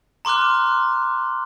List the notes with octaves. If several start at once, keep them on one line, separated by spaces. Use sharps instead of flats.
A#5 C6 D6 F6 F#6